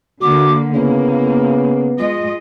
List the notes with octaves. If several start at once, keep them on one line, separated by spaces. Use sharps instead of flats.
D3 A#3 F#4 D6
C#3 A#3 B3 E4
G#3 F4 D#5